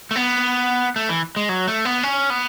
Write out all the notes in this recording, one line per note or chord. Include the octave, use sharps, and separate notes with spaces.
A3
B3
A3
E3
G#3
F#3
A3
B3
C#4
B3